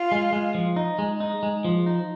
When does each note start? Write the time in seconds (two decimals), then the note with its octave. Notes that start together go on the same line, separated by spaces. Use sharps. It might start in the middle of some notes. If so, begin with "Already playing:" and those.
Already playing: F4
0.12 G#3
0.32 G#3
0.55 F3
0.76 D#4
0.99 G#3
1.20 D#4
1.43 G#3
1.65 F3
1.86 D#4